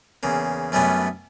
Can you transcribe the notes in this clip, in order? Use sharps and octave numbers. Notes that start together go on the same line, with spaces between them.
E2 C#3 A#3
F#2 G3 A3 B3 C#4 D4